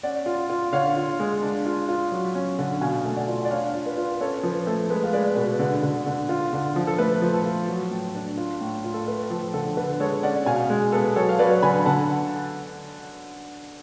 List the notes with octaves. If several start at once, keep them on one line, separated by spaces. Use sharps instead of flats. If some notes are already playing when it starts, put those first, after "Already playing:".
C#4 D5 F#5
F4
F4
D3 C#5 F5
F4
G#3
D4
F4
F4
F#3
C#4
D3
B2 F5 G#5
A3
D5 F#5
F4
D5
D4 C#5 F5
F4
B4 D5
F4
B4
C#4 A4 C#5
F3 B4
A3 A4
G#3 B4
F5
G#3 B4 D5
B2 B4
D3
D3
D3
F4
D3
F3
A4
A3 B4
F3
A4
F4
F#3
A2
D4
F4
A2
F4
A4
A3 B4
F3 A4
D3 A4
D3 B4
G#3 A4 C#5
C#4 D5 F#5
B2 F5 G#5
G#3
B3 A4
F#3 A4 C#5
F5
F#3 B4 D5
D3 G#5 B5
D3 F#5 A5